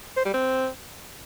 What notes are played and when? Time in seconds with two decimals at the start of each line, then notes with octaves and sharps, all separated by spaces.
0.16 C5
0.25 G3
0.34 C4